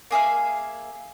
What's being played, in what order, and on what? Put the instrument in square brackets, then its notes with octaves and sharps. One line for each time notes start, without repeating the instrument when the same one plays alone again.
[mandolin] A#3 G#4 E5 F5